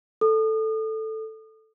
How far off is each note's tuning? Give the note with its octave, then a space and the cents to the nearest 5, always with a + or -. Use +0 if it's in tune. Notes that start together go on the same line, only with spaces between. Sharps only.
A4 +0 D#6 -40